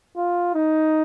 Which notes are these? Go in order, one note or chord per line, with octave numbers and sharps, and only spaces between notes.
F4
D#4